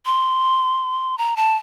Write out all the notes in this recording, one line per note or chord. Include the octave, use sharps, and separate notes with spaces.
C6
A#5
A5